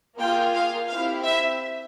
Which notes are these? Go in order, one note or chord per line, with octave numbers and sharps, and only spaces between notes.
A#3 F4 G#4 G5
F5
C4 E4 G4 F5
E5